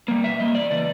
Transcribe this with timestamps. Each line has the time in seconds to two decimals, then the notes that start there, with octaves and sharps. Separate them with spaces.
0.08 G3 A#3
0.24 B2 E5
0.40 G3 A#3 D#5
0.55 E2 D5
0.71 C#3 E3 D5